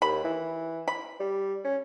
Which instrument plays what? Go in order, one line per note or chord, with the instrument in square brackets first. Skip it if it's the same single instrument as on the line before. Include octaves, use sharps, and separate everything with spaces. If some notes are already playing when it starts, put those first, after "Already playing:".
[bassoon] D#2 [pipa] B5
[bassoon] E3
[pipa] B5
[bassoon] G3
C#4